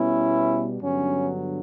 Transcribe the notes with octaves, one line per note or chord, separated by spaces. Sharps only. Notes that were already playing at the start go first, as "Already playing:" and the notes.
Already playing: B2 G3 B3 C#4 E4
G2 D3 F#3 B3 C#4